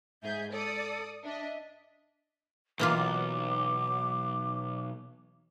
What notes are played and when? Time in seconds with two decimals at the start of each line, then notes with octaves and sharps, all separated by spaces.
0.23 G#2 G#4 E5 G6
0.52 A4 D5 D#6
1.24 D4 D#5 E5
2.79 B1 E3 A#3 F4 D6